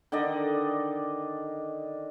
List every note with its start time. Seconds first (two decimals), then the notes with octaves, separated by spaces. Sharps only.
0.12 D3 D#3 D5 D#5